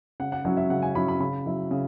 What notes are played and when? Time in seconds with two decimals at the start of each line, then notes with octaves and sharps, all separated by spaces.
0.20 C#3 F#5
0.32 F#5
0.45 F#3 C#4 E4 F#5
0.57 E5
0.70 C#3 F#5
0.82 G#5
0.95 F#3 C#4 E4 B5
1.08 B5
1.20 C#3 B5
1.46 F#3 E4
1.71 C#3